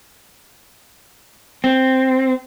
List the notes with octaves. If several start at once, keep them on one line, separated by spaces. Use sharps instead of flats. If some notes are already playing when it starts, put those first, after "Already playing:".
C4